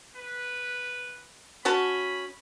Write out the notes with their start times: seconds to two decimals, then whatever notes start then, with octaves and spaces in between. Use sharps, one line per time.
0.17 B4
1.65 C#4 F#4 A5 B5